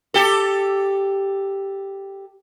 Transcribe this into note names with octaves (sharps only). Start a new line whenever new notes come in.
G4 A4